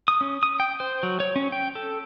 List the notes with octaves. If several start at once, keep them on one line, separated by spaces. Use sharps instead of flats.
D#6
C#4
D#6
G5
C5
F#3
C#5
C#4
G5
A4